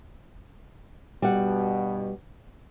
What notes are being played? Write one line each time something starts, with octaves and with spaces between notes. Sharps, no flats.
G2 B2 G3 F#5